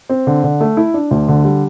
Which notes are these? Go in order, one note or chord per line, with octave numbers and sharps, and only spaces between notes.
C4
D3
D3
A3
E4
D4
D2
D3
G3